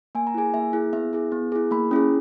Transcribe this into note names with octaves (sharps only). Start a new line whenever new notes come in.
A#3 G#5
A#5
E4 G#4 G#5
A#3 E5
E4 G#4
B3 E5
E4 G#4
B3
E4 G#4
A#3 B5
C#4 E4 G#4